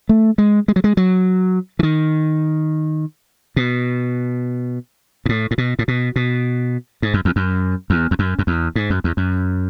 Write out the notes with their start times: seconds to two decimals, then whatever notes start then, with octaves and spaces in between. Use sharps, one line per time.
0.09 A3
0.38 G#3
0.68 G#3
0.76 F#3
0.84 G#3
0.97 F#3
1.79 E3
1.83 D#3
3.56 B2
5.26 G#2
5.29 A2
5.51 A2
5.58 B2
5.79 A2
5.88 B2
6.16 B2
7.02 G#2
7.14 F#2
7.25 E2
7.36 F#2
7.90 E2
8.11 E2
8.19 F#2
8.39 F#2
8.47 E2
8.76 G#2
8.90 F#2
9.04 E2
9.17 F#2